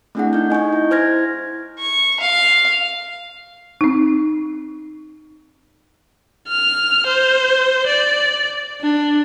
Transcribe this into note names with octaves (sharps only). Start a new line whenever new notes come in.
A3 C4 D4 E4 G#4 F#5
D#4 G6
D#5 G#5 C#6 G6
E4
E4 C5 F6 G#6 A#6
C#6
F5
C4 D#4
F6
C5
D5
D4